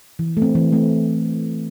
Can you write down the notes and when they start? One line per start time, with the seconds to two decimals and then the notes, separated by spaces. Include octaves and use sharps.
0.19 E3
0.37 A3
0.42 C4
0.55 E3
0.73 A3 C4